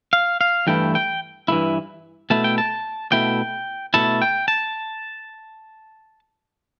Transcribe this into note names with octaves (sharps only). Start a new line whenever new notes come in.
F5
F5
G2 E3 A3 E4 G5
G5
G2 E3 A3 E4
B2 A3 E4 A5
G5
A5
B2 A3 E4 G5
B2 A3 E4 A5
G5
A5